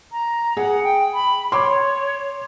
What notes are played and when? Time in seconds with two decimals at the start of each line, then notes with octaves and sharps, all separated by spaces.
0.12 A#5
0.57 G#4 F#5
0.84 G5
1.14 B5
1.52 C#5 C6 D6